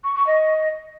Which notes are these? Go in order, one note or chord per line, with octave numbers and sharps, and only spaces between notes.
C#6
C#6
D#5